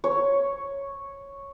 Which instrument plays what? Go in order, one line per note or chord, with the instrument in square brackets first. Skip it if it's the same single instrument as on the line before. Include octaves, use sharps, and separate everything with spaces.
[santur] C#5